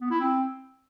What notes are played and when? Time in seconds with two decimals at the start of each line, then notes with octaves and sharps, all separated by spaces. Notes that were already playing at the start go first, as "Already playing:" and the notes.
0.01 B3
0.11 E4
0.21 C4